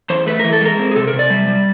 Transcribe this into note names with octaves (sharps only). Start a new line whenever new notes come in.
E2 C5
A3 B4
E3 A#4
A4
G#3 A#4
C4
G#4
C3 A4
A#4
C3
D5
G3
G3